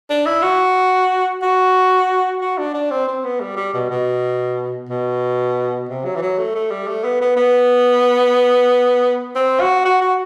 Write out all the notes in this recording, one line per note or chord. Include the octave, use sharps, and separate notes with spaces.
D4
E4
F#4
F#4
F#4
D4
D4
C4
C4
B3
G3
G3
B2
B2
B2
C3
F#3
E3
F#3
A3
A3
G3
A3
B3
B3
B3
C4
F#4
F#4
F#4